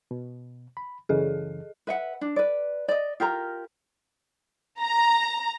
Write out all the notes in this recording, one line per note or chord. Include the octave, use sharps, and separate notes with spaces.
B2
B5
F#2 C#3 E3 G#4 A4 D#5
B4 E5 F#5
D4
B4 D5
D5 D#5
F4 G4 A#4 A#5
A#5